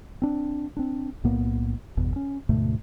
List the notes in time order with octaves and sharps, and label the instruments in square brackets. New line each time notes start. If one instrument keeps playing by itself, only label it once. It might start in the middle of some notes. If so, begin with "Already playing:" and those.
[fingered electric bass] C4 D4
C4 D4
B1 A2 A#3 B3
G1 E2 B2
C#4
D2 G#2 B2 A3